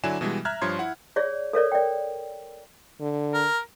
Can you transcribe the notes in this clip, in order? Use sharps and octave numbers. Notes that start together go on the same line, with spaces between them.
D3 F#3 D4 E4 G#5 E7
B2 E3 G3 G#3
E5 A#5 F6 F#6 G#6
G2 F3 C#5 C6 G#6
E4 F#5
G#4 C#5 D5
A4 A#4 C#5 D5
D5 G5
D3
A#4